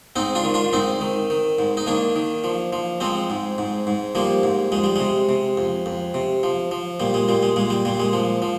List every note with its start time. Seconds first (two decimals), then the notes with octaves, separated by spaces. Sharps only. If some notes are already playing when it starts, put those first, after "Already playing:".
0.16 G#2 C4 D#4
0.35 D4 F4
0.44 D#3
0.54 D4 F4
0.73 G#2 C4 D#4
1.01 D#3
1.30 D#3
1.59 G#2
1.77 D#4
1.87 D#3 A#3 D4
2.16 D#3
2.44 F3
2.73 F3
3.00 F3 G#3 C4
3.30 G#2
3.58 G#2
3.87 G#2
4.15 F3 G3 A#3
4.43 G#2
4.72 F2 G#3
4.84 G3
4.96 C3 G#3
5.29 C3
5.58 F2
5.86 F2
6.14 C3
6.43 F3
6.71 F3
7.00 A#2 G3
7.14 G#3
7.28 A#2 G3
7.43 G#3
7.56 A#2 G#3
7.70 G3
7.85 A#2 G3
8.00 G#3
8.13 F3
8.42 F3